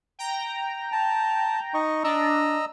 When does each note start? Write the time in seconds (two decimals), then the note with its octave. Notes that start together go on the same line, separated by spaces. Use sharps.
0.19 G5 A#5
0.92 A5
1.74 D#4 D#5 C#6
2.04 D4 D#5 A#5 E6